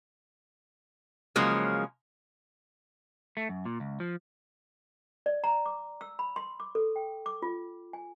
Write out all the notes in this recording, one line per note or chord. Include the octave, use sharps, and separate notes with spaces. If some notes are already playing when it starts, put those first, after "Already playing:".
C#3 F3 F#3 G#3 A#3
A3
F#2
A#2
C#2
F3
D5
A#5
D6
E6
B5
C6
D6
A4
G5
D6
F4
G#5